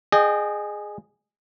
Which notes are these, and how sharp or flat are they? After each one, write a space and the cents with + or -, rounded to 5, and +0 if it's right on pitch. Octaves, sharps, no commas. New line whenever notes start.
G#4 +0 D#5 -30 G5 -10